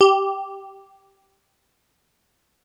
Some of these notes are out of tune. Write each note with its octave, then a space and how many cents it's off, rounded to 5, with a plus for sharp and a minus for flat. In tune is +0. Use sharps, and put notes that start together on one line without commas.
G4 -10